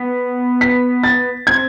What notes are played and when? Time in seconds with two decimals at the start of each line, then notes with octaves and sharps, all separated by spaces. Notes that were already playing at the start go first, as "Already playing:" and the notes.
Already playing: B3 B6
0.61 B6
1.04 A6
1.47 C4 G#6